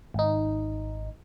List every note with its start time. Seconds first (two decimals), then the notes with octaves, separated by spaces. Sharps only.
0.14 G#1 D#4